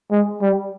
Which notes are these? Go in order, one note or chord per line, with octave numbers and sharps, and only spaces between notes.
G#3
G3